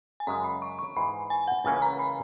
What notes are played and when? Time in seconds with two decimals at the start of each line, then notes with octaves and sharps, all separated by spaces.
0.20 G#5
0.27 F#2 C#3 G#3 A#5
0.44 B5
0.62 C#6
0.79 C#6
0.96 G#2 E3 G#3 D#4 B5
1.30 G#5
1.48 F#5
1.64 C#2 C#3 E3 A#3 C#4 G#5
1.82 A#5
1.99 B5